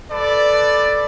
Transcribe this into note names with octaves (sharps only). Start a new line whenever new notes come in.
A4 B4 D5